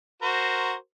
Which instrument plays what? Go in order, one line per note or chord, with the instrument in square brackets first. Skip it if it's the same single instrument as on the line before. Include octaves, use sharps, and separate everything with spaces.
[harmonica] F#4 A#4 C5